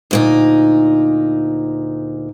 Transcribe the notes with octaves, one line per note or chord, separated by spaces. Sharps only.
D2 A#2 D#4